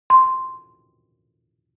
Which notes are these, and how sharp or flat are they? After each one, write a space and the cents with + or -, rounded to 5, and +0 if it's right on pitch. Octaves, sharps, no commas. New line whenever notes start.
C6 -5